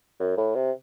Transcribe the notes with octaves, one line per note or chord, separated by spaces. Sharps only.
F#2
A2
C3